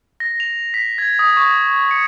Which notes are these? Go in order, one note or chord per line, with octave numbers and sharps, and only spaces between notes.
A#6
F7
B6
G#6
D#6
C#6
C#7